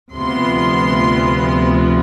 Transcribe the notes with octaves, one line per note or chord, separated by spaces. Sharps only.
D2 C3 F3 B3 F4 C6